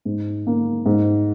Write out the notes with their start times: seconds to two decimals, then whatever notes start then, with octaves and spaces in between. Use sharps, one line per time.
0.05 G#2
0.47 A#3
0.86 G#2